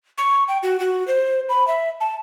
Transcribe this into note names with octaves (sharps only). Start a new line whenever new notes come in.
C#6
G5
F#4
F#4
C5
B5
E5
A5